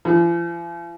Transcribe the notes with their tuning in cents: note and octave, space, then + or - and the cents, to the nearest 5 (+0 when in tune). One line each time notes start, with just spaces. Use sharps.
F3 -45